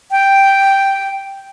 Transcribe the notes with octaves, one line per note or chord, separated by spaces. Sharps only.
G5